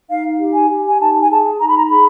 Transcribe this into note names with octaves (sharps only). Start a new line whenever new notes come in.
D#4 F5
G4
G#5
G4
G#5
D#4 A5
G#5
G#4 A5
D#4 A#5
B5
A#5
G#4 B5